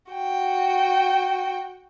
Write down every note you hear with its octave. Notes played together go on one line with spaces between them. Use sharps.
F#4 G5